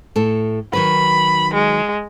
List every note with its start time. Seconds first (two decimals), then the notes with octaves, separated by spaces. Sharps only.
0.16 A2 A4
0.73 D#3 F#3 B4 B5
1.54 G#3